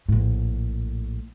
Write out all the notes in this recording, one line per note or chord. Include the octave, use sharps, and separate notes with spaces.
A#1 A2